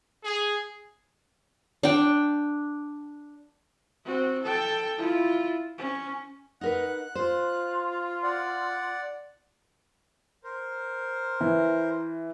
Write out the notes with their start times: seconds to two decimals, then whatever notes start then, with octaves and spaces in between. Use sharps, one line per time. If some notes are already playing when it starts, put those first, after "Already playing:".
0.24 G#4
1.83 D4 G5
4.04 C4 F#4
4.43 A4 G5
4.97 E4 F4
5.78 C#4
6.61 D#4 A#4 B4 F#5 F#6
7.15 F4 C5
8.23 D5 F#5
10.44 A#4 C5
11.41 E3